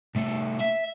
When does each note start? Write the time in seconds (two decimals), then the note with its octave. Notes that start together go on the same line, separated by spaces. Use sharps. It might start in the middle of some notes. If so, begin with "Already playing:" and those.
0.15 C2 A3
0.61 E5